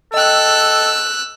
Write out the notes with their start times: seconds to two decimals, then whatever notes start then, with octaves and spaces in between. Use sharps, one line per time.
0.14 A4 D#5 G5 E6 F#6